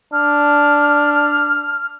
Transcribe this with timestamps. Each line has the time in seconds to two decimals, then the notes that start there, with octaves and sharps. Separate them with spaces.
0.13 D4 F6